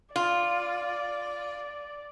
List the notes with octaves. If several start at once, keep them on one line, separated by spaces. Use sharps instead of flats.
F4 D5